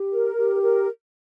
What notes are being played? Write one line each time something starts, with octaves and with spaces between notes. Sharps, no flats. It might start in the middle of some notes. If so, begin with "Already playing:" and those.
Already playing: G4
A#4
G4
A#4